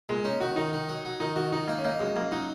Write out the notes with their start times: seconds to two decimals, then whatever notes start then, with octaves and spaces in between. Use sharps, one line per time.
0.09 A#2 G#3
0.24 C#4 D#4
0.40 D#3 F#4
0.56 D#3 D#4
0.73 D#3
0.89 F#3
1.05 F#3
1.20 D#3 D#4
1.36 D#3 F#4
1.52 D#3 D#4
1.68 A#3 D#4
1.78 C#4
1.84 A#3 D#4
2.00 F#2 G#3
2.16 F#2 A#3
2.32 F#3 D#4